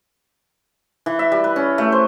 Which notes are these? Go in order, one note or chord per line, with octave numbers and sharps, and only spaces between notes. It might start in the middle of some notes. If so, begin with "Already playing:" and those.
E3
E5
G3
B4
C#4
A3
C5